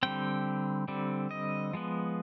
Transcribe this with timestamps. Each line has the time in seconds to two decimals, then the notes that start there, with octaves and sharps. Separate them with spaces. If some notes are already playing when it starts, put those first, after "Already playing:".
0.03 D3 G3 C4 G5
0.88 D3 G3 C4
1.31 D#5
1.73 F3 G#3 B3